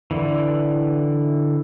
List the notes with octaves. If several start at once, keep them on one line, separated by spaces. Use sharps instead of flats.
D3 E3